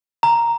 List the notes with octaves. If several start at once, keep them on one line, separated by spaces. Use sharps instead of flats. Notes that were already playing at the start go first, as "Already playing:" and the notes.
A#5